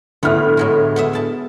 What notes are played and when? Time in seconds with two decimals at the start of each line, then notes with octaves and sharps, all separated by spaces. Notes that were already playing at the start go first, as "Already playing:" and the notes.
0.23 D2 A2 B3 E4 F6
0.57 A2 F#3 G#3
0.96 B3 G#4 E5
1.13 E4 A5